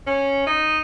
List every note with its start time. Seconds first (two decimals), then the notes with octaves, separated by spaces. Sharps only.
0.07 C#4
0.47 D#4